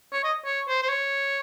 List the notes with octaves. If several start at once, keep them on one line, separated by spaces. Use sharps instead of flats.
C#5
D#5
C#5
C5
C5
C#5